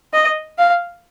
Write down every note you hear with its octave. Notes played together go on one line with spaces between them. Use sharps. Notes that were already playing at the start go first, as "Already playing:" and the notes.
D#5
F5